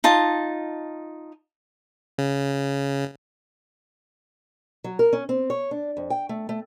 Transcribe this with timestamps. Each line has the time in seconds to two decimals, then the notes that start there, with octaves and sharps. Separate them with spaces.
0.04 D#4 F4 A5
2.18 C#3
4.84 F#3
4.99 A#4
5.13 C#4
5.29 C4
5.50 C#5
5.71 D4
5.97 F2
6.10 G5
6.29 A3
6.49 A3